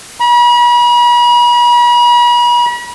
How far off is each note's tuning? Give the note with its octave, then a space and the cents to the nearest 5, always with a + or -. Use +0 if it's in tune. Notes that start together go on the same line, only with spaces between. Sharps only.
B5 -45